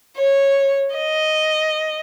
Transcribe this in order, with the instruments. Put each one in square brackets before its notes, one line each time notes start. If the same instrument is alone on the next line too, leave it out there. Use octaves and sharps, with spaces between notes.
[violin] C#5
D#5